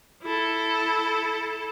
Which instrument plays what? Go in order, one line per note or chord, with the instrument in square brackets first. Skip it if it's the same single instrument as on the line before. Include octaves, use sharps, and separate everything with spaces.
[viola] E4 A4